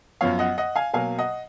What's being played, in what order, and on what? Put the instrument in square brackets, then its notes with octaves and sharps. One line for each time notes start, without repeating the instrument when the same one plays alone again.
[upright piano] F#2 F3 B3 C#5 F5
D#5 F#5
D#5 F#5
F5 G#5
B2 F#3 A#3 F5 G#5
D#5 F#5